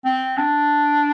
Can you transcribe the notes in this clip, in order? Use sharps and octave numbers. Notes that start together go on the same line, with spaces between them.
C4
D4